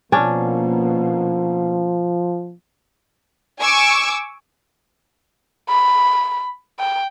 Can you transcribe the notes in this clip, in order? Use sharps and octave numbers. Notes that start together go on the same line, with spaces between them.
B2 F3 A#3 C#4 D4
G#5 C#6 D6 E6
B5
G5